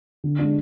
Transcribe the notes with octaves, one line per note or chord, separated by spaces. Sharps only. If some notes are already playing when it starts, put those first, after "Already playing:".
D3
G#3 D4